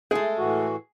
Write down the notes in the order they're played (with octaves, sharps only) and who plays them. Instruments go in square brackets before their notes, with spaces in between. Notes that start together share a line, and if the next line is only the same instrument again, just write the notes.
[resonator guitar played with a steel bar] G#3 A3 [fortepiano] G#4
[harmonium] A2 E3 F#4